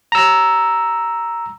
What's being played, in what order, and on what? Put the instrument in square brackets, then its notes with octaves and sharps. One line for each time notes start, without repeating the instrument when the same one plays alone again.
[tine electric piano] A#5 E6